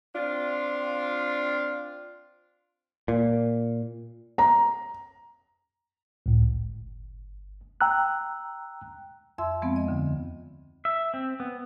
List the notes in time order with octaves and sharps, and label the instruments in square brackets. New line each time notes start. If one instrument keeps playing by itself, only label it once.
[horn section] C4 D4 F4
[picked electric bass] A#2
[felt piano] A#5
[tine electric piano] C#2 A2
G1
G5 A#5 E6 F#6
[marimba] F2 E5 C6 E6
F3 G#3 B3 C4
D#5
D#2 D3
[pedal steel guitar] E5
C4
B3